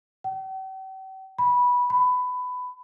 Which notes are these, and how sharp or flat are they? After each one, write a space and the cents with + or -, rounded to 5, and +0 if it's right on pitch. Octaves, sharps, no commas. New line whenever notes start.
G5 -45
B5 -15
B5 +15